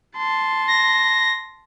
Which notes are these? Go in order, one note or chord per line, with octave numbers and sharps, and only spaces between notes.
A5 C6
A#6